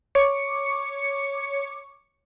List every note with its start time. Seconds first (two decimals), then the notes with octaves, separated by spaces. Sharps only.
0.15 C#5 C#6 D6 C#7